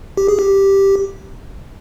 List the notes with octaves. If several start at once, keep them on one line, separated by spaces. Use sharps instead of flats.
G4
G#4
G4